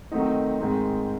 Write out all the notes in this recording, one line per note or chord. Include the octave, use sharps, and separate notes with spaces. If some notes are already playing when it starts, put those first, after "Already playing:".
D#3 F#3 A3 C4 D#4
G#2 D#3 G#3 C4